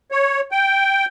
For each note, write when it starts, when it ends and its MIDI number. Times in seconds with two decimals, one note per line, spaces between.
0.12 0.40 73
0.52 1.05 79